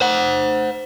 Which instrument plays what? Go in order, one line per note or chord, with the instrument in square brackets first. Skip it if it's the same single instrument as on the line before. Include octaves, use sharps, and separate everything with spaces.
[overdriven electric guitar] C5 F#5